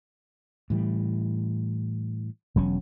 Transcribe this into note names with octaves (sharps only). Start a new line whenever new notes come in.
A2 E3 G3
E1 F#3 C#4